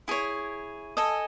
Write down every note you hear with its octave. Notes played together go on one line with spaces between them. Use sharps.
E4 G#4 C#5
A4 D#5 G#5